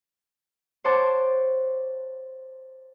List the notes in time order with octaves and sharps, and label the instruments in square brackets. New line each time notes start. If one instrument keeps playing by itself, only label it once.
[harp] C5 C#5 F#5 A5 C6 D6